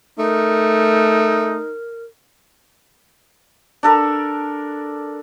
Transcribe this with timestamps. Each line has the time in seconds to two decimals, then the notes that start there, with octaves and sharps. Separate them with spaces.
0.19 A3 D#4 A#4
3.83 D4 A4 A#4